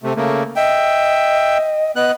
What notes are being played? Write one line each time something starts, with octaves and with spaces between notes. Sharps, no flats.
C3 A3
C#3 A3 A#3
D#5 E5 G5
B3 D#5 F#6